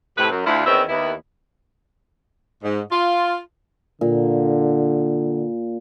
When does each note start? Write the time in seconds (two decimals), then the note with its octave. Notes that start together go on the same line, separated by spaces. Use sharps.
0.18 A2 C3 B4
0.31 F#2
0.46 D2 E4 F4
0.66 E2 D#3 C4 C#4 E4 E5
0.89 D#2 B3 E4
2.63 G#2
2.90 F4
4.01 A#2 D3